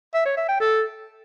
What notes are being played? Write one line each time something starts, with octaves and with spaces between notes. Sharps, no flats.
E5
C#5
E5
G5
A4